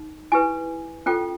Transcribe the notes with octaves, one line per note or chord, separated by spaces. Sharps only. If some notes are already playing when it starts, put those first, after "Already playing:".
Already playing: D#4
E4 G4 B4 G#5
C#4 F4 A4 G5